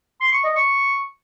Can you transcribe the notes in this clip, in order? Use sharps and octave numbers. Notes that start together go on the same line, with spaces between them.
C6
C#6
D#5
C#6